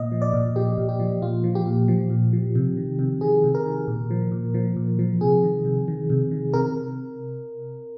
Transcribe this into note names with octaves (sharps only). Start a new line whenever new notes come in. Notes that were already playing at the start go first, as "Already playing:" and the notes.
Already playing: A#2 D#5
F3
D5
A#2
F3 G4
A#2
G4
F3
A#2 F4
F3
G4
A#2
F3
A#2
F3
C3
D#3
C3
D#3 G#4
C3
A#4
D#3
A#2
F3
A#2
F3
A#2
F3
C3 G#4
D#3
C3
D#3
C3
D#3
C3 A#4